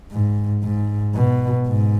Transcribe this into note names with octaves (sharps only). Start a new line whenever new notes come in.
G#2
G#2
B2
G#2